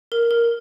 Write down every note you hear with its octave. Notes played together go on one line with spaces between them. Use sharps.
A#4
A#4